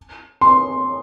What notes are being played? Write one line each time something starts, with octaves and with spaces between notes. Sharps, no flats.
C6